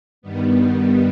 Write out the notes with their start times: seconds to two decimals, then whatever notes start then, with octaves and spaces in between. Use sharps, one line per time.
0.22 G2 D#3 G3 B3